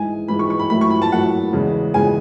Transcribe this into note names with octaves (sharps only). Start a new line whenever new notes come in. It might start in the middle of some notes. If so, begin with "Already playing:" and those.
Already playing: G#2 E3 G#3 G#5
G#2 E3 G#3 B5
C#6
C#6
B5
A2 F#3 A3 B5
C#6
B5
A5
A2 F#3 A3 F#5
E2 C#3 G#3
E2 C#3 G#3 G#5